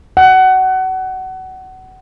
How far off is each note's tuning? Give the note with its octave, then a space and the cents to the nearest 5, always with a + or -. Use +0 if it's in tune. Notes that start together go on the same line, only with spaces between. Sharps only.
F#5 +25